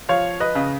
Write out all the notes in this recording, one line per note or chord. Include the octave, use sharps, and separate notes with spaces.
F3 C#5 F5
B4 D#5
C#3